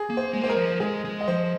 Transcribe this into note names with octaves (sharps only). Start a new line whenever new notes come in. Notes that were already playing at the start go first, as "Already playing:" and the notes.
Already playing: G#4
A#3
C5
G#3
A#3 C5
G#3 A#4
F3
G#3 G#4
G#3
D#5
F3 C5